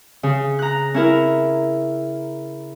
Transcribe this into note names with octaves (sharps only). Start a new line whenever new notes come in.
C#3
A#5 F#6
C#4 E4 A#4